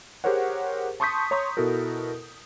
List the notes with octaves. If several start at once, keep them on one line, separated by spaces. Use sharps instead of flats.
G4 G#4 A#4 C5 C#5 F#5
A5 C6 C#6 D#6 G6 B6
C#5 A#5 C6 C#6 D#6 B6
B2 E4 F#4 A4 A#4